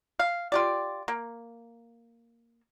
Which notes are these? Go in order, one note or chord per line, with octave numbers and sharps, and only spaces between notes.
F5
F4 G4 D5
A#3